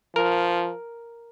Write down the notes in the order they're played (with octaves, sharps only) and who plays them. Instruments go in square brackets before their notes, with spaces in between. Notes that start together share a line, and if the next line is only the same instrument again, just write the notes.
[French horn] F3 [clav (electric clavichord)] A#4